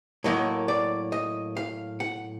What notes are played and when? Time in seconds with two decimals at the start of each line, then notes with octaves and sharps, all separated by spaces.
0.24 A2 F#3 A#3 D#5
0.68 D5
1.12 D#5
1.57 F5
2.00 F#5